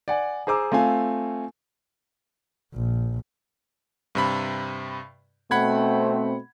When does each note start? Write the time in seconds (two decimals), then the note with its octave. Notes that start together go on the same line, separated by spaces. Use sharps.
0.08 D5 F#5 G#5
0.47 G#4 C5 A#5 D6 E6
0.72 A3 C4 F4 F5 G#5
2.74 A#1
4.15 G2 C3 B5
5.51 B2 A3 C4 F#5 B5 G#6